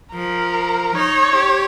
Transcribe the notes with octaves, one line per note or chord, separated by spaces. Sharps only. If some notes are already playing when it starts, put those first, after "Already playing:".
F3 A#4
D#4 C#5
G4